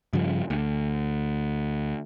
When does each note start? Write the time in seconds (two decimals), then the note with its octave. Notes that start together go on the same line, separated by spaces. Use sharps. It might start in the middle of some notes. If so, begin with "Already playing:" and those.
0.13 G2 C#3 F3
0.50 D2